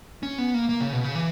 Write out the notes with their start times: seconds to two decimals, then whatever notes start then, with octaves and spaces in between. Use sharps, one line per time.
0.23 C#4
0.38 B3
0.54 A#3
0.69 A#3
0.81 C#3
0.93 B2
1.04 C#3
1.15 E3